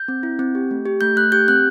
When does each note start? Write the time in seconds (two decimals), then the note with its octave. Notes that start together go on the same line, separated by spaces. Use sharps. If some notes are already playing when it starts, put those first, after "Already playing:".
Already playing: G6
0.08 C4
0.23 E4
0.39 C4
0.55 G4
0.71 A3
0.86 G4
1.01 A3 G6
1.16 A3 F#6
1.32 G4 G6
1.48 C4 F#6